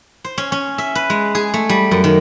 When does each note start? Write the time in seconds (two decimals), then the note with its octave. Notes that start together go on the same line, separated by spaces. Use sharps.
0.24 C5
0.38 C#4
0.52 C#4
0.78 E5
0.95 B4
1.10 G#3
1.35 G#4
1.54 A3
1.69 G3
1.91 F#2
2.04 D#3